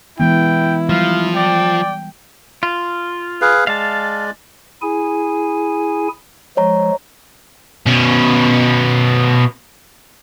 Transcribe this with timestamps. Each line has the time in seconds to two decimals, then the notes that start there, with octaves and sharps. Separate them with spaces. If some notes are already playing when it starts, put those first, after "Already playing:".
0.20 E3 G#3 B3 E4 G5
0.89 F3 G3 F5
1.36 D5 G5
2.63 F4
3.41 G#4 B4 F5
3.67 G#3 D5 F5 A5
4.82 E4 G#4 G#5
6.57 F3 G#3 C#5 A#5
7.86 B2 C#4